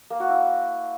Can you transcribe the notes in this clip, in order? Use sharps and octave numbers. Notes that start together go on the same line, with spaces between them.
A#3
F#4
E4